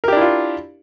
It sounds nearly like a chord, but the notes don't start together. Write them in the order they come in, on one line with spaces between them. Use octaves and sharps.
A#4 G4 D4 E4 F4